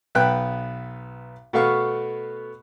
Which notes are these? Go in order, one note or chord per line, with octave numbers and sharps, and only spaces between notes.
B1 B3 B4 G5 F#6
B2 A3 B3 F5 C#6